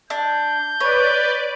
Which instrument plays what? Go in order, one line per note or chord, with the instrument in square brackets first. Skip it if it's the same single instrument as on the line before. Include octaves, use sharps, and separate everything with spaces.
[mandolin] D4 [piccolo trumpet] G6
[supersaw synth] B4 D5 [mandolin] C#5